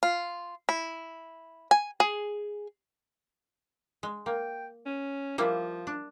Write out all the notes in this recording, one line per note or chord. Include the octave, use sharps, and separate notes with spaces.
F4
E4
G#5
G#4
G#3
A#3 G5
C#4
F3 G3 A#3 E4
D4